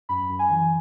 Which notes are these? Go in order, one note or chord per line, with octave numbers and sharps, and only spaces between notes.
F#2 B5
F#2
G#5
E3